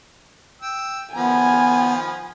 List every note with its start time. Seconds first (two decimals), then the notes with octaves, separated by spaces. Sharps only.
0.62 G5 E6
1.16 D#3 F3 B3 G#5 B5